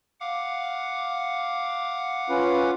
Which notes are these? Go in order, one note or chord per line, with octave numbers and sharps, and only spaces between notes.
F5 F#5 D6
C#4 F4 B4